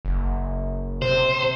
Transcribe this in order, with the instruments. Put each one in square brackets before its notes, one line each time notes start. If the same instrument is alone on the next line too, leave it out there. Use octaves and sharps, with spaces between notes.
[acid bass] F#1
[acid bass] C3 [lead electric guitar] C5